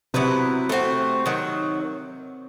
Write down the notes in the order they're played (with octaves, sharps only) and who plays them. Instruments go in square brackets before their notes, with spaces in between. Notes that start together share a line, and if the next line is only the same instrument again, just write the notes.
[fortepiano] C3 [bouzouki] F#3 B3 E4 B4
[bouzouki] A3 C4 F#4
D#3 F#3